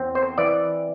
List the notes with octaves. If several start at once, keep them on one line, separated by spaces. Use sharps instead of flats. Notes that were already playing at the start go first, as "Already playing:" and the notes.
Already playing: E2 C4
C5
E3 D5